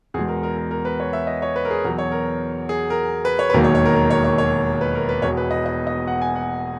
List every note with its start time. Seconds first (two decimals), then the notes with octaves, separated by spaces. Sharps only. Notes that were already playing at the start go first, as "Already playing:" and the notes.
0.14 E2 G#4
0.17 B2 G#3
0.28 A#4
0.43 A#4
0.57 A#4
0.71 A#4
0.85 B4
1.00 C#5
1.13 E5
1.27 D#5
1.42 C#5
1.56 B4
1.65 A#4
1.70 G#4
1.85 E2 B2 F#3 A#4
1.98 C#5
2.12 A#4
2.69 G#4
2.90 A#4
3.25 B4
3.39 C#5
3.50 B4
3.53 E1 D#2 D#3 F#3 A#3 A#4
3.64 C#5
3.75 C#5
3.85 A#4
3.96 A#4
4.10 C#5
4.24 C#5
4.38 C#5
4.81 B4
4.95 A#4
5.09 B4
5.22 E1 E2 B2 C#5
5.37 B4
5.51 D#5
5.66 D#5
5.87 D#5
6.07 F#5
6.22 G#5
6.36 F#5